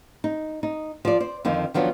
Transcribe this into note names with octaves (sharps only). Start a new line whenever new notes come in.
D#4
D#4
F3 D5
C5 D5
F2 D3 D#3 F3
D#3 F3 F#3 B3 D4